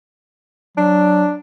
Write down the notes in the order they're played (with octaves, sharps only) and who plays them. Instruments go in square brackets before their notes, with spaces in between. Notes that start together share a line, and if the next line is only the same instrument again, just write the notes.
[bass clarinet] F#3 [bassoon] D4